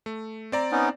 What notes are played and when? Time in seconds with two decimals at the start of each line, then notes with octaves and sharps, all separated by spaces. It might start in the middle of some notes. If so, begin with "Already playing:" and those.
0.06 A3
0.52 C4 D5 A#5
0.72 B3 C#4 D#4